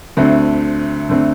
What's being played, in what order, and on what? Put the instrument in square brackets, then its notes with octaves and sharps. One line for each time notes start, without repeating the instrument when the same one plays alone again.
[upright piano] D2 D3 A3 C4
D3 A3 C4